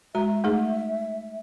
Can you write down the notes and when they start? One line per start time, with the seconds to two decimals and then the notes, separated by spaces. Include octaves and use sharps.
0.15 G#3 F#4 E5 A#5
0.44 A3 D#4 G#4